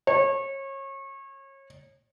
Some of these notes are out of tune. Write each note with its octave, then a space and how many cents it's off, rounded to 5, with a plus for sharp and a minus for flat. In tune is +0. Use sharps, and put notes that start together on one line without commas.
C#5 -30